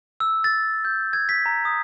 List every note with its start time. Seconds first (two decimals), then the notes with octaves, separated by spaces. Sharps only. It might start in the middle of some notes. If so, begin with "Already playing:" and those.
0.20 E6
0.44 A6
0.85 G6
1.13 G#6
1.29 B6
1.46 A#5
1.65 D#6